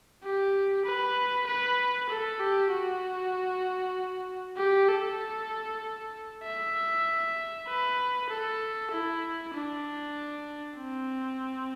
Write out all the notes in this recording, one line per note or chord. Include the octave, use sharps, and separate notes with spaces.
G4
B4
B4
A4
G4
F#4
G4
A4
E5
B4
A4
E4
D4
C4